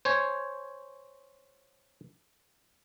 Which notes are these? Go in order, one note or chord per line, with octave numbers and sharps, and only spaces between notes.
C5 C#5 G#5